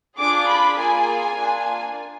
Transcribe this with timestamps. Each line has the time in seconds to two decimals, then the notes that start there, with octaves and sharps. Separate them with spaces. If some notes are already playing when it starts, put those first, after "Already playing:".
0.18 D4 F4 G#4 D6
0.47 B5
0.77 A#3 F4 G#4 G#5
1.37 A#3 D4 F4